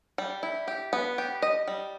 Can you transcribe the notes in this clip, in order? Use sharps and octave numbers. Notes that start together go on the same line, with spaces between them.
G3
E4
G4
B3
G4
D#5
G3